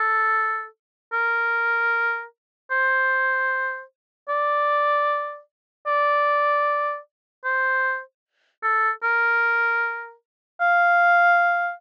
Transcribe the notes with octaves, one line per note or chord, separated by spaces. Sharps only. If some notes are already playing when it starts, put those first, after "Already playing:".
Already playing: A4
A#4
C5
D5
D5
C5
A4
A#4
F5